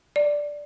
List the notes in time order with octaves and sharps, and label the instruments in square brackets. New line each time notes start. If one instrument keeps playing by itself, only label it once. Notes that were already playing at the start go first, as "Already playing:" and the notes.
[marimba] D5